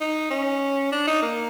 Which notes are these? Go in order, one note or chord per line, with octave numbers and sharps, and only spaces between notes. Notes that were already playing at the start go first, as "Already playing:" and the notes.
D#4
C#4
D4
D#4
A#3